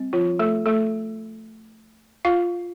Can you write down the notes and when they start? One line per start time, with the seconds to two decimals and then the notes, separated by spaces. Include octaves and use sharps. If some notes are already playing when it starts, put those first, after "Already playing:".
Already playing: G3 C4
0.13 F3 F4
0.39 A3 A4
0.66 A3 A4
2.25 F4 F5